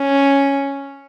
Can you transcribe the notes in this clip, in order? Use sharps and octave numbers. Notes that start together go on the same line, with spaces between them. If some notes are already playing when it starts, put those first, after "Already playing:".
Already playing: C#4